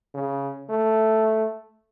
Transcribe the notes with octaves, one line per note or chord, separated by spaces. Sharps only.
C#3
A3